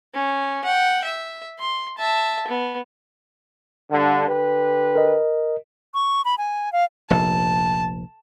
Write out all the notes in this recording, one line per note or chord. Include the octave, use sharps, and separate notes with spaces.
C#4
F#5 G5
E5
C6
E5 A5
B3
G2 D3
D3 G4 B4
A#4 D#5
C#6
B5
G#5
F5
F1 A#1 A5